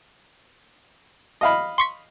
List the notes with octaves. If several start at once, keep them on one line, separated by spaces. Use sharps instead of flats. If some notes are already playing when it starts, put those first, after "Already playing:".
D#5 F5 B5
C6 C#6 B6